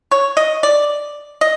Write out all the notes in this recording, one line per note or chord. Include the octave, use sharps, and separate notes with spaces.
C#5
D#5
D5
D#5